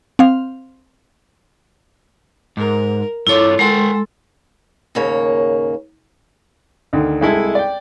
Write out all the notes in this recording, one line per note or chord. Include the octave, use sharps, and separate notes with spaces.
C4 F5
G#2 A#4
G2 E4 F4 A4 C#5 D6
G#3 A4 A#4 F#5 G5 C6
D#2 G#2 C#3 A#3 C#5
D2 D#3
C2 G#3 E4 A4
D5 G5